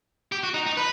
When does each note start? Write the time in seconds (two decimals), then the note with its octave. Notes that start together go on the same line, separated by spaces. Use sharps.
0.32 G4
0.43 F#4
0.54 D#4
0.66 D#4
0.77 B4